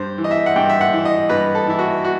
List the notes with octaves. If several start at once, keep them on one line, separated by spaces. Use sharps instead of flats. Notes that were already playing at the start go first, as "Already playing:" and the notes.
Already playing: G2 C5
E3
D#5
E5
F#5
G2 G5
E5
F#5
E3
D#5
G2 B4
A4
E3 E4
F#4
F#4